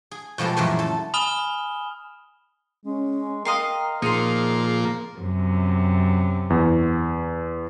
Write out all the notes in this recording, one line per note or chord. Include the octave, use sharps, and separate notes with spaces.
G#4
B2 F3 G3 G#3 A4
F#2 A#2 C#3 E3 G#3 A3
A4 A5
G#5 B5 D#6 F6 E7 G7
G#3 C#4
A#4 D#5 F5 G5 C6
A#2 F3 A#3 D#4 G#4 A#4 C6
F#2 C3
E2